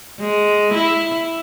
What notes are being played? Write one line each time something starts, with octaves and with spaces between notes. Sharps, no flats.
G#3
E4